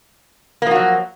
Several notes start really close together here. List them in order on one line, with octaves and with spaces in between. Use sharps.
A#3 F3 F#4 F#3